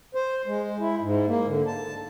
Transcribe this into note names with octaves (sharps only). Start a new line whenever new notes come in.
C5
G#3
E4
G#2
A#3
D3
A5